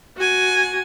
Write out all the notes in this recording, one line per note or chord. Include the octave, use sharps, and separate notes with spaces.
F#4 G#5